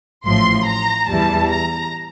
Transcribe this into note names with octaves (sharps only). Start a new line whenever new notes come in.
A1 A2 F3 C6
A#5
E2 E3 G3 A5
A#5